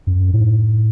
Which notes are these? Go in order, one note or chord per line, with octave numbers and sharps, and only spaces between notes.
F#2
A2